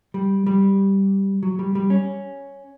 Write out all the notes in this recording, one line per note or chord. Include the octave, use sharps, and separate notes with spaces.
G3
G3
F#3
G3
G3
C#4